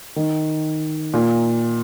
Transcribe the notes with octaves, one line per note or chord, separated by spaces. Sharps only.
D#3
A#2